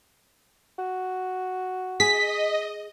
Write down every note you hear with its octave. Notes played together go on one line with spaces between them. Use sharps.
F#4
G#4 D#5 B6